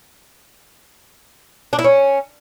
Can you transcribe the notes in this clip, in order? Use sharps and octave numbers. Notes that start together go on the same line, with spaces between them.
D4
E4
C#4